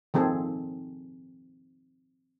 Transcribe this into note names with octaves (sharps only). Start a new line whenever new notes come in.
D#3 F3 C4 G#4 A4